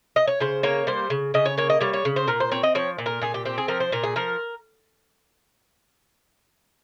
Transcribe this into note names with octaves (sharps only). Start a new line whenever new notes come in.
D#5
C#5
C#3 C5
A#3 C#5
G3 C5
C#3
C#3 D#5
C#5
A#3 C#5
D#5
G3 C#5
C#5
C#3
C5
A#2 A#4
C5
C4 C#5
D#5
F3 C#5
A#2
A#4
A#2 G#4
G4
C4 G4
G#4
F3 A#4
C5
A#2 A#4
G#4
F3 A#4